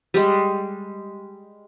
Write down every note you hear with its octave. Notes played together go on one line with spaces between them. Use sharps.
G3 G#3